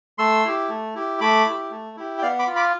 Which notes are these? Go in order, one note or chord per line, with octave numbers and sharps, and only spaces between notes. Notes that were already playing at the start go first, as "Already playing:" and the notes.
A3 C6 E6
E4 G4
A3
E4 G4
A3 B5 D6
E4 G4
A3
E4 G4
G5
B3 D5 F5
B5 D6
F4
B5 D6